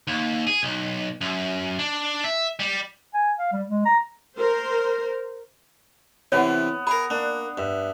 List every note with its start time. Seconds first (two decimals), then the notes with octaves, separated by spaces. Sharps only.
0.07 D#2
0.47 G#4
0.63 B1
1.21 F#2
1.79 D4
2.24 E5
2.60 G3
3.14 G#5
3.38 F5
3.52 G3
3.68 G#3
3.85 A#5
4.37 A#4 C5
6.32 C3 E3 B3 C#5 F#5
6.87 G#4 A#4 B5
7.10 A#3 D4
7.58 G2 E5